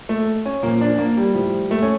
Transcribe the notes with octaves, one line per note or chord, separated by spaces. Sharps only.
A3
C#4
A#2 F3 A#3
D4
A#3
G3
A2 F3
A3
C#4